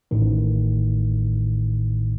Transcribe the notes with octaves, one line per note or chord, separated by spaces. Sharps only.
A1 A2 D#3